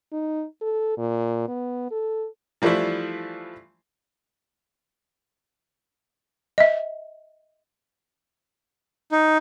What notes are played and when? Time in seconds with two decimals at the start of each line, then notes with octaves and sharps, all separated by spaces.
0.12 D#4
0.61 A4
0.98 A#2
1.48 B3
1.91 A4
2.62 E3 F3 G3 A3 D4 E4
6.58 D#5 E5
9.12 D#4